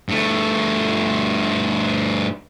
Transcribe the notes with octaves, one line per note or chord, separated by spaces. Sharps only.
G2 A3